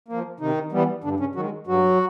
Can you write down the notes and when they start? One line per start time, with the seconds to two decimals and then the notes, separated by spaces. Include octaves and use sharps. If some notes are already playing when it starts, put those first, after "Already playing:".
0.08 F3 A#3
0.40 C3 D#3 D#4
0.72 E3 G3 B3
1.04 G2 D3 D4
1.20 C#3 C#4
1.35 D#3 F#3 F#4
1.40 G#3
1.67 G2 F#3 F#4